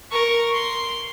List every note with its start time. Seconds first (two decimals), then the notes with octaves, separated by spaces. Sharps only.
0.12 A#4 C#6
0.54 C6